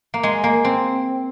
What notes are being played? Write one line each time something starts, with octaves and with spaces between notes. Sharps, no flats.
A#3
G#3
A#3
C4